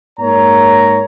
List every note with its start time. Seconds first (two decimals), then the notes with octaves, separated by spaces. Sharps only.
0.19 G#2 A#3 C#5 A#5